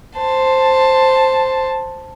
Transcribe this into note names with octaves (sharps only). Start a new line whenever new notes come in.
C5 A5